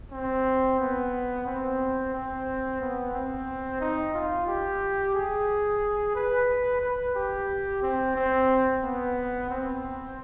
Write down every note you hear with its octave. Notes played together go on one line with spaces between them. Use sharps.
C4
B3
C4
C4
B3
C4
D#4
F4
G4
G#4
B4
B4
G4
C4
C4
B3
C4